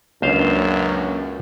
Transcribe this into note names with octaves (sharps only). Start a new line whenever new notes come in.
C#2 F#2 A#3 C#4 D4 C5 F5